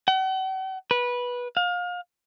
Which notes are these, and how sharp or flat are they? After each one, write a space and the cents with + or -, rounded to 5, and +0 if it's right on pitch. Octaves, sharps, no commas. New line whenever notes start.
F#5 +45
B4 -15
F5 +30